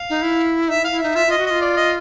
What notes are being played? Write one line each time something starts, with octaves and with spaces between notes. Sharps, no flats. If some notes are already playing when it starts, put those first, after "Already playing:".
Already playing: F5
D#4
E4
D#4 E5
E4
F5
E4
D#4 E5
F4 E5
F4 D#5
F#4
F4 D#5
D5
D#5